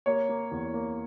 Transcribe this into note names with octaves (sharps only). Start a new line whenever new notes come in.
A#3 C#5
A#3
E2
A#3